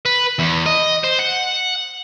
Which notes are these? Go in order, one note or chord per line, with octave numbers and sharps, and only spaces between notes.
B4
E2
D#5
C5
F#5